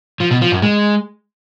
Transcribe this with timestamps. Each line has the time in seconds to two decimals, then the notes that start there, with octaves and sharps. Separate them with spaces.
0.20 F3
0.31 B2
0.41 F3
0.52 F#2
0.62 G#3